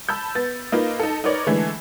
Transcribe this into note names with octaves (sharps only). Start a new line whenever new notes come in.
A5 B5 E6 G6
B3 A6
A#3 D#4 F4 B4
D#4 A4
D#4 A#4 B4 C#5 D5
D3 E3 G#3 A3